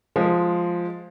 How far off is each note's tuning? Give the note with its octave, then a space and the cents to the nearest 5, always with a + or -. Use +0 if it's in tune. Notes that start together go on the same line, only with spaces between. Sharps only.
F3 +0 G#3 +0